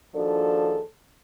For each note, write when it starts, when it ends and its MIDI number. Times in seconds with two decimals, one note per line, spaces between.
0.14 0.80 39
0.14 0.80 53
0.14 0.80 62
0.14 0.80 66
0.14 0.80 68
0.14 0.80 69